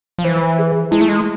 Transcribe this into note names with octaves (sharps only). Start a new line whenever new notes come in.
F3
E3 C5
G#4
G#3 E4
A3
G#3